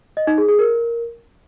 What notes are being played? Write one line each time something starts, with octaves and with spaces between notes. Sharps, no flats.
D#5
D#4
G#4
G#4
A#4